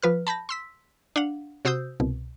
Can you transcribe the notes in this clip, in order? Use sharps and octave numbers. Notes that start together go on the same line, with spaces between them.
F3 B4 F6
A5 B5 G6 A#6
C6 E6 B6
D4 F5 F#5
C3 F#4 C5 D#6 E6 G6
C2 B2